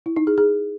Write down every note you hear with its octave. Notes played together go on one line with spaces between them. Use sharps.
E4
D#4
G#4
G#4